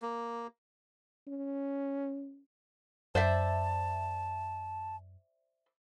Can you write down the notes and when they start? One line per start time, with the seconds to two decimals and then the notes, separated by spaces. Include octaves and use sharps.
0.02 A#3
1.28 C#4
3.15 F#2 C5 D5 E5 A5